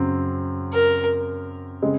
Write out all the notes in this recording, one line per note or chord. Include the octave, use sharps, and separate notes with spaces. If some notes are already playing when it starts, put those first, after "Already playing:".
Already playing: F#2 C#3 F#3 C4
A#4
C#3 G#3 C4